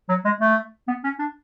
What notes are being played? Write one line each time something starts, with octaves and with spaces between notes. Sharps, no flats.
F#3
G#3
A3
B3
C#4
D4